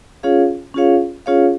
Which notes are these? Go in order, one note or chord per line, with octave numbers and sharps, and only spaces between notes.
C#4 F4 G#4 C#5 F5
C#4 F4 G#4 C#5 F5
C#4 F4 G#4 C#5 F5